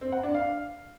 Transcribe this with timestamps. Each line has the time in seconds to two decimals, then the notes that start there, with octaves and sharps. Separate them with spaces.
0.01 C4
0.12 F#5
0.23 D4
0.34 F5